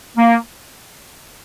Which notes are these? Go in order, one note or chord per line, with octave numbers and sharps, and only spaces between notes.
A#3